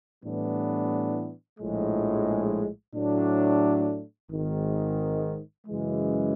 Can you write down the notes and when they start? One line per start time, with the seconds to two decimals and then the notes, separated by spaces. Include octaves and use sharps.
0.24 A2 E3 G3 B3 D4
1.60 A#1 A2 F3 G#3
2.95 A2 F#3 A3 D4
4.31 G#1 G#2 D#3
5.67 F#2 C#3 E3 G#3